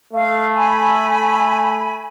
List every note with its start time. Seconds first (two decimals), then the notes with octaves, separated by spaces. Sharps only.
0.13 A3 F5
0.55 G#5 B5